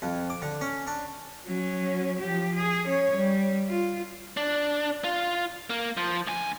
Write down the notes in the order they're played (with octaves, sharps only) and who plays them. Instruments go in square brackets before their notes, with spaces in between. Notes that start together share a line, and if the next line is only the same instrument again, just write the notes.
[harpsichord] F2
D6
D3
C#4
D4
[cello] F#3 C#4
F3 G4
G#4
C#4 C#5
G3
F4
[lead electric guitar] D4
F4
A#3
F3
D2 G#5